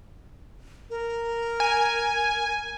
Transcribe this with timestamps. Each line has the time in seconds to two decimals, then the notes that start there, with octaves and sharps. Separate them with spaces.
0.90 A#4
1.60 G#5